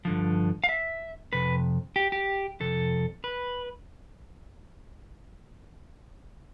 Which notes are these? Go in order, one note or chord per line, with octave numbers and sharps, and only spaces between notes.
G2 D3 F3
F5
E5
F2 C3 B4
G4
G4
F2 C3 A4
B4